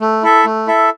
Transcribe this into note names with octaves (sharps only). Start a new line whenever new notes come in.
A3
E4 A4 E5
A3
E4 A4 E5